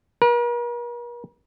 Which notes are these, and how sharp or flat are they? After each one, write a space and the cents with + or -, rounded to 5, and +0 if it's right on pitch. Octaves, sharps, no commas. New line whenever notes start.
A#4 +45